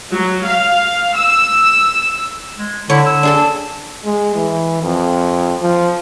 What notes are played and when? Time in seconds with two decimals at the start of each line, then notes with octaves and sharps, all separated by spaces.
0.13 F#3
0.46 F5
1.17 E6
2.58 G#3
2.90 D3 E4 C#5
3.06 D3 E6
3.23 D4 G#4 A4
4.05 G#3
4.36 E3
4.83 F2
5.62 F3